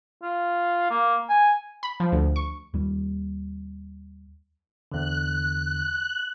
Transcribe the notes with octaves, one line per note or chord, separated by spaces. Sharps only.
F4
A#3
G#5
B5
F3
D2
C#6
D#2 G3
E2 D3 F#6